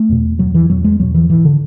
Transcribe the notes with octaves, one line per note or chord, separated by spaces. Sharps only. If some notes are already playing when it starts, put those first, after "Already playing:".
Already playing: A3
E2 B2
E2 B2 F#3
E3
E2 B2 F#3
G#3
E2 B2 F#3
E3
G#2 E3
D3